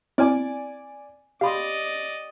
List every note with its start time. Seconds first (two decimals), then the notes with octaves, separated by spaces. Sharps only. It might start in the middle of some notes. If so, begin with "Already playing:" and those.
0.18 C4 E4 D5 G#5 D6 F6
1.41 G4 D5 D#5 F5 B5 C6